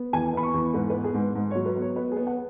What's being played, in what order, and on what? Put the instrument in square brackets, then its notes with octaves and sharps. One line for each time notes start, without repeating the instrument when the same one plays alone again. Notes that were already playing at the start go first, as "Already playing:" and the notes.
Already playing: [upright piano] B3
E2 G#5
B3 B5
C#6
E2
G#2 B4
B4
B3
G#4
G#2
G#2
C#5
F#3
B4
B3
C#5
B3 B4
G#4
B3
F#5